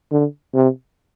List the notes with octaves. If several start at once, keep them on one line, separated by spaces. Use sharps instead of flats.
D3
C3